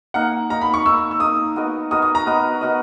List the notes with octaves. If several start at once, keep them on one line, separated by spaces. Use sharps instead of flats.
A#3 D#4 A#4 F#5
A#3 D#4 A#4 A#5
B5
C#6
A#3 D#4 A#4 E6
E6
A#3 D#4 A#4 D#6
B3 F#4 A#4 D#5
B3 F#4 A#4 D#5 D#6
D#6
A#5
B3 F#4 A#4 D#5
B3 F#4 A#4 D#5